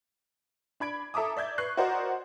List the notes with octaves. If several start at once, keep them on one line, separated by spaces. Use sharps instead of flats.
D4 B5 G#6 D7
A4 E5 A#5 D6 D#6
D5 E5 G6 G#6
B4 C#6 F#6 G6 C7
F#4 A#4 C5 D5 D#5 F#5